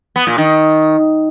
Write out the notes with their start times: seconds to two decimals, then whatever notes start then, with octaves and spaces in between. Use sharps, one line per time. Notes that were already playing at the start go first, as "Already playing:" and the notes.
0.16 B3
0.27 A#2
0.38 D#3